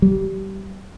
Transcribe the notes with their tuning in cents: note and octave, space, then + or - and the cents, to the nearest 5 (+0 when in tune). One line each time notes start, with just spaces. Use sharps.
G3 -25